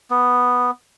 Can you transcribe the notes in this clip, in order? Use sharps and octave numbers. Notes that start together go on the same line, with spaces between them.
B3